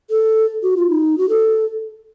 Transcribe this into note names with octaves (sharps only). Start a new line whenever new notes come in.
A4
F#4
F4
D#4
F#4
A4